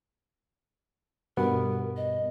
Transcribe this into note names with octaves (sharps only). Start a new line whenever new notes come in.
G2 B2 B3 A#4
D#5